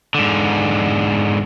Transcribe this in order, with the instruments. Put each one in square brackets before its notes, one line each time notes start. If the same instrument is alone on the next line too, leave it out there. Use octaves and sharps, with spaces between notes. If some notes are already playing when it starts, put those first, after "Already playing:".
[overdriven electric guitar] G#2 D3